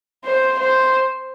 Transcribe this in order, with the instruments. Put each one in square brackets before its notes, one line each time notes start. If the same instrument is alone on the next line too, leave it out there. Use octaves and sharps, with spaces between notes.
[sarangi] C5
C5